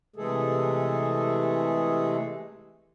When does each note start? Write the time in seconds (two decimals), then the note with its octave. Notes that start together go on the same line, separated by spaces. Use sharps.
0.16 C3 E3 G#3 A3 G#4 A4